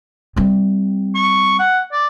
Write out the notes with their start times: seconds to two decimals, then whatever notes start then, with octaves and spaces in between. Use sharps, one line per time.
0.36 G3 C4
1.15 C#6
1.59 F#5
1.92 D5